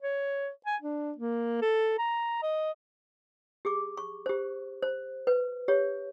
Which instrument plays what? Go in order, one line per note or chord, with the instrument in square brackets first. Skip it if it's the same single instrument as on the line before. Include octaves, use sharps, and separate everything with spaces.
[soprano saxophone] C#5
G#5
D4
A#3
A4
A#5
D#5
[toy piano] G4 G#4 D6
C#6
G4 C5
C5
B4
G4 C#5